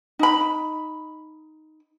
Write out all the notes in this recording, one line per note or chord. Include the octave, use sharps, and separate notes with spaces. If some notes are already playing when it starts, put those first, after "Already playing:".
D#4 B5